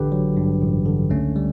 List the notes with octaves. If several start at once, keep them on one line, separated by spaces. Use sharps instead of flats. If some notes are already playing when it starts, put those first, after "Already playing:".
Already playing: A1 D3 G4 B4
F#3
G2
A1
D3
C#2 A3 C#4
G3